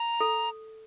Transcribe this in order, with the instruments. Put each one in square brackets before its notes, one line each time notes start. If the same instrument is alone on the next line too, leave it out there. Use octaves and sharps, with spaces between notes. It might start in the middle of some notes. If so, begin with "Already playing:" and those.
Already playing: [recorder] A#5
[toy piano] A4